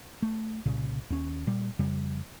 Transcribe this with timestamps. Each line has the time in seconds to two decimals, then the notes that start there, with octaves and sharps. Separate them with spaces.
0.22 A3
0.66 C2 A#2 C#3
1.10 D#2 C#4
1.47 A#2 G3
1.79 F2 C#3 G3